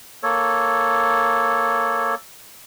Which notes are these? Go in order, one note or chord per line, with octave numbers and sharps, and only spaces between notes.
A#3 A4 C#5